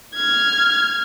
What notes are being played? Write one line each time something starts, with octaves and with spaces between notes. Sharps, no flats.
F6 G#6